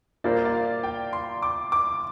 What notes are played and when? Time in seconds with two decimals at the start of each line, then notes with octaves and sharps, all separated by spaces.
0.24 A#2 A#3 G4 C5 D5
0.45 D5
0.54 F5
0.83 G5
1.13 C6
1.43 D6
1.72 D6